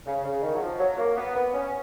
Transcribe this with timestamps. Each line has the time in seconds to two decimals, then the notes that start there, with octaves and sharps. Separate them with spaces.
0.06 C#3
0.24 C#3
0.42 D#3
0.54 F#3
0.61 F3
0.79 F#3
0.98 A#3
1.17 B3
1.35 B3
1.54 C#4